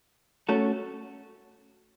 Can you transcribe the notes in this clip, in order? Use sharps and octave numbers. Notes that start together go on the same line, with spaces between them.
A3 C#4 F#4 A4